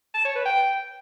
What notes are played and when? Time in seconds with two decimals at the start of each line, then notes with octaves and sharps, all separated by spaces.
0.15 A5
0.25 C#5
0.35 B4
0.46 G5